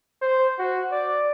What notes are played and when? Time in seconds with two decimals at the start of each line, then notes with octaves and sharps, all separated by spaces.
0.22 C5
0.58 F#4
0.92 D5